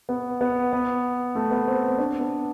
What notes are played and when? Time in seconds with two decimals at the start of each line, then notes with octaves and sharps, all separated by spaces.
0.09 B3
0.41 B3
0.73 B3
1.35 A3
1.51 B3
1.68 C4
1.83 C4
1.99 D4
2.20 B3